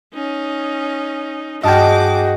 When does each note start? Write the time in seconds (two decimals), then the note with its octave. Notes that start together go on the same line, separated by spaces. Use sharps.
0.13 C#4 D#4
1.63 G2 F#4 G#4 D#5 G5 A5 D6 F6